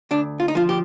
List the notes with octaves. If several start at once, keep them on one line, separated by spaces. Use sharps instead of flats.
D2 D4
F4
D#4
F3 F4
G4